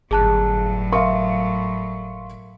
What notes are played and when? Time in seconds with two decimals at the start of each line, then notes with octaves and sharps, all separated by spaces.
0.11 G1 A2 F#3 G#4 A5 F#6
0.93 A#4 E5 F5 C6 C#6